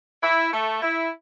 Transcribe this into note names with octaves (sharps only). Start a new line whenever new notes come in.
E4
A3
E4